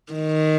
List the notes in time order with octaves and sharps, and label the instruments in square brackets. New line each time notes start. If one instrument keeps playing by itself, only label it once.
[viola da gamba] D#3